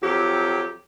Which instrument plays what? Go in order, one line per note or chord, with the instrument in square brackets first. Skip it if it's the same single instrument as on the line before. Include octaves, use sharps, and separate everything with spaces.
[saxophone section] F2 F#3 G4